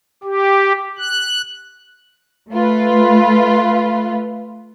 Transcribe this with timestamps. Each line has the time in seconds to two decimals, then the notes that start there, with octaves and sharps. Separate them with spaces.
0.24 G4
0.99 F#6
2.52 A3 F4 B4